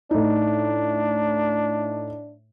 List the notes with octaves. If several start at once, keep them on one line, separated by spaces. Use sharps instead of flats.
A2 D4 D#4